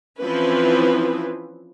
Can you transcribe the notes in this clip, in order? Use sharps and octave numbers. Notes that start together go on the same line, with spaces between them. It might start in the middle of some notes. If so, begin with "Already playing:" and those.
E3 F3 C4 C#4 E4 B4